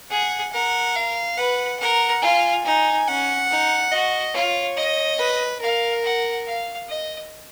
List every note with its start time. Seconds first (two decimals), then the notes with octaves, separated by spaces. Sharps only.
0.10 G#4 F#5
0.53 A#4 F#5
0.95 F5
1.37 B4 F#5
1.80 A#4 F#5
2.22 F4 G#5
2.65 D#4 G#5
3.07 C#4 F#5
3.50 D#4
3.91 F#4 D#5
4.34 F4 C#5
4.77 D#5
5.19 B4
5.62 A#4 F5
6.04 F#5
6.46 F5
6.88 D#5